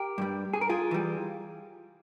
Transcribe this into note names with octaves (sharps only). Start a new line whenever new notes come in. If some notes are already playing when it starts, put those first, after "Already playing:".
Already playing: G4 A#4
G2 G3
G#4
A#4
F4 G#4
E3 G3